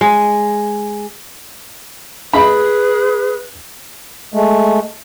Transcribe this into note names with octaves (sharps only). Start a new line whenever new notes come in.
G#3
G#4 B4 B5
G#3 A3